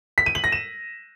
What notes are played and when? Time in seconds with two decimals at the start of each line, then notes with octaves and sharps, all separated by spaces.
0.18 B6
0.26 D#7
0.35 F#7
0.44 A#6
0.52 E7